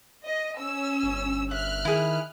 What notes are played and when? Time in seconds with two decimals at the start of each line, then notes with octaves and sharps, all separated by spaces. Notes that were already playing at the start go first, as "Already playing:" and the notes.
0.24 D#5
0.58 C#4 E6
1.03 G1
1.51 E5 F6 F#6
1.85 D#3 E4 G#4